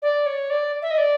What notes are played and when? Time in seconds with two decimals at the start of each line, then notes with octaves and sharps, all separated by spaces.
0.02 D5
0.26 C#5
0.50 D5
0.82 E5
0.90 D#5
0.98 D5